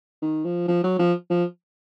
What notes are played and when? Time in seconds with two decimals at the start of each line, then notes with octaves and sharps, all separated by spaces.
0.22 D#3
0.45 F3
0.68 F3
0.84 F#3
0.99 F3
1.30 F3